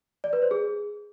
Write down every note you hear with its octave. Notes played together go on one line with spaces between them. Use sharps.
D5
B4
C5
G#4